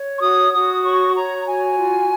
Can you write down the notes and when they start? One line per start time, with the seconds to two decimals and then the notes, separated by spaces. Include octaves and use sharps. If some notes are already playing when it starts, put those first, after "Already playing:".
Already playing: C#5
0.16 C#6
0.20 F#4 D#6
0.52 F#4 D#6
0.83 C#5 C#6
1.15 C#5 A#5
1.46 F#4 G#5
1.78 F4